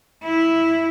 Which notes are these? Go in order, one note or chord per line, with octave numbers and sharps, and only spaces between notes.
E4